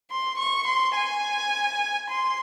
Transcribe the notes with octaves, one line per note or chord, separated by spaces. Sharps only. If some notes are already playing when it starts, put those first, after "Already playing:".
C6
C#6
C6
G#5
C6